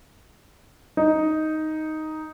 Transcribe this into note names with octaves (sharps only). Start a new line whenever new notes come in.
D#4